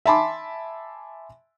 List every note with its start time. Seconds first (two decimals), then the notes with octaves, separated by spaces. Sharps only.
0.06 E5 G#5 A5 B5 C6 D6